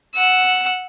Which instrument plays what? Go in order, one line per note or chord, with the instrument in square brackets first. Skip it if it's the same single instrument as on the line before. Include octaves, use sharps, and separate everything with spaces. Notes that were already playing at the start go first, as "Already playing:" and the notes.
[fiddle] F#5 E6